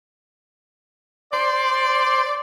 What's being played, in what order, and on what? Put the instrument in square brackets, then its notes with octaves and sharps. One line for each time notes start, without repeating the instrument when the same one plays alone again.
[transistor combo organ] C5 C6 [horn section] D5